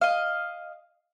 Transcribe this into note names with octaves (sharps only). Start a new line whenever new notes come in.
D#5 F5